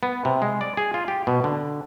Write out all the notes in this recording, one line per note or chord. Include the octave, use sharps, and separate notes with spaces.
B3
C3
G#3
D5
G#4
F4
G4
B2
D3